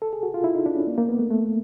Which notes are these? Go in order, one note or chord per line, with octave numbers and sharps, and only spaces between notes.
A4
G#4
F#4
F4
E4
D#4
D4
C#4
A#3
A#3
B3
A3
A3